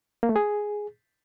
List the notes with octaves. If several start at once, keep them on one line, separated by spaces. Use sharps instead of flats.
A#3
A3
G#4